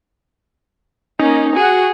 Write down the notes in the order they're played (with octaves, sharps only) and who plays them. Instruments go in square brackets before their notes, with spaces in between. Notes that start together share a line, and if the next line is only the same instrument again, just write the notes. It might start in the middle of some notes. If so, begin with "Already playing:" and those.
[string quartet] A#3 C#4 [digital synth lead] D#4
[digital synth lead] F#4 [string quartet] G#4 F#5